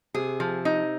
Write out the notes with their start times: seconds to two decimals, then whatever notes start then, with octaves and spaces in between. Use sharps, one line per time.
0.14 C3 G#4
0.40 F3
0.65 D#4